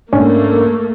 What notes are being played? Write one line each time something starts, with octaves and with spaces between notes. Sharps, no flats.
G#2 A3 A#3 C#4 D4